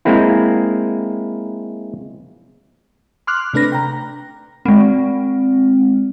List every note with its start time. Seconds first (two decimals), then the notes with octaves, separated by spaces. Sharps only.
0.05 G#3 A#3 C4 E4
3.27 C6 D6 F6 F#6
3.54 C3 A3 D4 B4 A#6
3.72 G5 A#5
4.65 G#3 C4